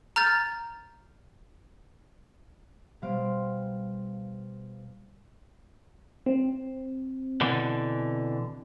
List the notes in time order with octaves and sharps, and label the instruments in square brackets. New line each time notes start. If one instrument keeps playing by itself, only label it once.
[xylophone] A#5 F6 G6 A6
[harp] B2 G3 C5 F5 D7
[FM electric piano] C4
[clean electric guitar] B2 D3 E3